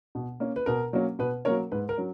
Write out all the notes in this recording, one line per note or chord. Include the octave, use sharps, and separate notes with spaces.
B2
A#3 C#4
B4
B2 A#4
F#3 A#3 C#4
B2 B4
F#3 A#3 C#4 A#4 C#5
G#2 B4
A#4
F#3 C#4